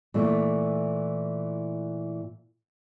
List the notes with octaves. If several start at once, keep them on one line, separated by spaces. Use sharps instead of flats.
A#2 E3 A3